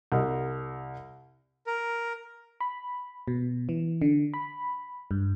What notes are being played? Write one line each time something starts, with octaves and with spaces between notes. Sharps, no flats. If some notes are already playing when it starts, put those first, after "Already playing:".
C2
A#4
B5
B2
E3
D3
B5
G2